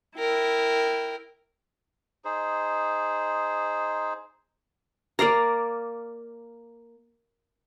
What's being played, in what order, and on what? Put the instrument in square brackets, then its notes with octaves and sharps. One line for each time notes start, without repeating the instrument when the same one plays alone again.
[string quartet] E4 A#4 G5
[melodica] D#4 G#4 C5
[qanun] A#3 D5 F5 A#5